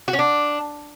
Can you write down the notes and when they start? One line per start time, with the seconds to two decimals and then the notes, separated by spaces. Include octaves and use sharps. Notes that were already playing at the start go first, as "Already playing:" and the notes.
0.08 F#4
0.13 C#4
0.19 D4